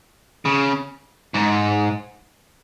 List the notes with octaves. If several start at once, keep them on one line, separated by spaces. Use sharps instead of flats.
C#3
G#2